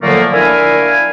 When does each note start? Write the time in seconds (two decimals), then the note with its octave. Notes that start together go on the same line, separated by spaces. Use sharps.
0.02 A#2 D3 F3 F#3 A3 A#3
0.32 D4 E4 A#4 E5 F5 G#5